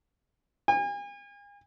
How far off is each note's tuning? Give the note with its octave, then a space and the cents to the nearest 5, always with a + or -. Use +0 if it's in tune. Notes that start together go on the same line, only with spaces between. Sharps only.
G#5 -40